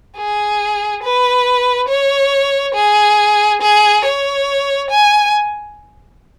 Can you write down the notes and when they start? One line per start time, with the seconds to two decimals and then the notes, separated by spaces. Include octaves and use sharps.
0.17 G#4
1.03 B4
1.89 C#5
2.75 G#4
3.61 G#4
4.04 C#5
4.90 G#5